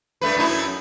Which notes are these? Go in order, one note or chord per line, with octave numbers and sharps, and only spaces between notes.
G2 A3 B4
F#2 D#4 E4